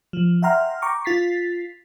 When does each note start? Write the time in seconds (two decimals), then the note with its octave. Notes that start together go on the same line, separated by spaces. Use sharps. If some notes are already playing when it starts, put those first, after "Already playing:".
0.13 F3
0.42 E5 F#5 G5 A#5 C6 F6
0.82 G5 A#5 C#6 D6
1.05 F4 A6 B6 C7